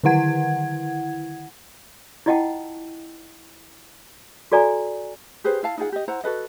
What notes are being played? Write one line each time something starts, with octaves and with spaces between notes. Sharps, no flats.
D3 D#3 E4 F#5 G#6
E4 F4 D#5 F#5 G5 A5
F#4 A4 D5 G#5 A#5
G4 G#4 B4 C5
E4 F5 A5
D#4 F4 G#4 F#5
G4 D#5
E4 C5 F#5 A#5
F#4 A4 B4 D#5